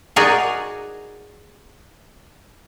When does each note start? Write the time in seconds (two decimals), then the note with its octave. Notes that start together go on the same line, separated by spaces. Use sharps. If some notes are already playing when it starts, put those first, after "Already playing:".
0.16 D#4 F#4 G#4 A#4 D5